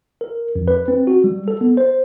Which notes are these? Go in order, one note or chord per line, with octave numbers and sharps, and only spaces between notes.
A#4
F2
B4
C4
F#4
G3
A4
B3
C5